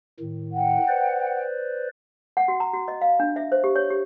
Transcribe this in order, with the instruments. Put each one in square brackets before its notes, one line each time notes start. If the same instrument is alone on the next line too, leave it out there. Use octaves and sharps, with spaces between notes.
[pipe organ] A2 D#3
[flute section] F#5 G5
[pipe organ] B4 C5 D5
[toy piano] F#5
F#4
A#5
F#4
D#5
F5
D4
E5
C5
G4
C#5
G4